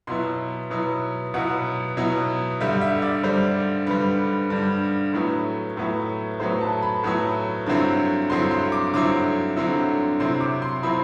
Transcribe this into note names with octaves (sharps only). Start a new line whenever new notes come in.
B2 F#3 B3 E4 C6
B2 F#3 B3 E4
B2 F#3 B3 E4 F#5
B2 F#3 B3 E4
G2 D3 G3 E5
E5
D5
G2 D3 G3 C5
G2 D3 G3 B4
G2 D3 G3
A2 F#3 B3 E4
A2 F#3 B3 E4
A2 F#3 B3 E4 C5
A5
B5
A2 F#3 B3 E4
G2 D3 F#3 C4 E4
G2 D3 F#3 C4 E4 C6
C6
D6
G2 D3 F#3 C4 E4 D6
G2 D3 F#3 C4 E4
C3 F#3 C4 E4 C6
D6
C6
C3 F#3 C4 E4 B5